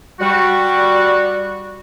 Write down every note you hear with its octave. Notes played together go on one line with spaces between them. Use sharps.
G3 F#4